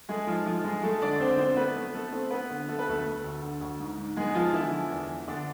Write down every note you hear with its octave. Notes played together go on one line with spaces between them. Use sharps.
G#3 A3 G#4
G#2 F3 F4
F3 A3 F4
G#2 G#3 G#4
G#3 A3 A4
D3 D4 D5
D3 C4 C5
B3 C4 C5
A3 B3 B4
A3
A3 A4
A3 C4 C5
A3 B3 B4
D3
A3 A4
B4
D2 A3 A4
A3
D2
D3
D2
G#2
G#2
G#3 B3 G#4
F3 B3 F4
D3 E3 E4
F3
E2
E2
D3 A3 D4